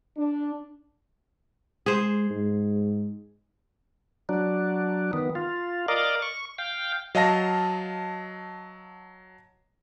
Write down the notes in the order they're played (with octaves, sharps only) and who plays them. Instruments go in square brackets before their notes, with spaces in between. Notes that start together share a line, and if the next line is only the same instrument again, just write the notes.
[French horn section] D4
[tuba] G#3 [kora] G#4 C5
[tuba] G#2
[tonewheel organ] F#3 D4
D#3 B3
F4
A#4 D5 D#5 F5
C#6
F5 G5
[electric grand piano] F#3 D#5 F5 A5 A#6